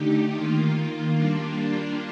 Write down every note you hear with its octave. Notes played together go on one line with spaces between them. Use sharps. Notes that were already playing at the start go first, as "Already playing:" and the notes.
Already playing: D3 A3 D#4 G4
D#3 A#3 F4
G3 A#3 D4 F4